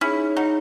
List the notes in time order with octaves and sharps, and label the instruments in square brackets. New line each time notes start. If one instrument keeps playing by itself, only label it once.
[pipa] C#4 E4 [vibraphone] D#4 G#4 C#5
[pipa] D#4 F#4